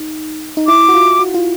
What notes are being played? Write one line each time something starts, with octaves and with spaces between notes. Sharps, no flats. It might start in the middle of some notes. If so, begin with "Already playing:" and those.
Already playing: D#4
D#4
E4 D6
F#4
F4
F#4
F4